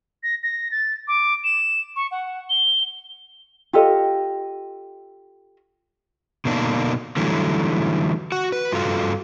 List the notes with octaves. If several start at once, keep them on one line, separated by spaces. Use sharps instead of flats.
A#6
A#6
A6
D6
E7
C#6
F#5
G7
F4 G4 A4 D#5
B2 D3 A#3 D4 D#4
D3 E3 F#3 G3 A3 E4
F#4 F#5
B4
G2 F4 F#4 A4 F5